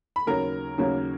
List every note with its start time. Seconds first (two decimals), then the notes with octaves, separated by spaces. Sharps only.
0.16 B5
0.26 D#2 C#3 F#3 A#3 C#4 A#4 A#5
0.78 D#2 C#3 F#3 A#3 C#4